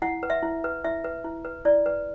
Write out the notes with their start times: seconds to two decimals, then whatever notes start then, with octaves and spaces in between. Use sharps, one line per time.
0.02 E4 F#5
0.23 B4
0.30 E5
0.43 E4
0.64 B4
0.85 E4 E5
1.04 B4
1.24 E4
1.45 B4
1.65 E4 D5
1.86 B4